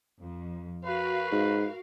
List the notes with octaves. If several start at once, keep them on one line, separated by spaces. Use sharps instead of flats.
F2
F#4 A#4 B4 F5
G#2